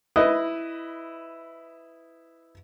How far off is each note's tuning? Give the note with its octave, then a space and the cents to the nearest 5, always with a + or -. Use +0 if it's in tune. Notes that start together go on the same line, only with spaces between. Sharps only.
E4 +0 B4 +20 D#5 +0